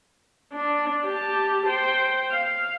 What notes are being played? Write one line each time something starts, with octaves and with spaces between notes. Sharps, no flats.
D4
G4 A5
C5 G5
F5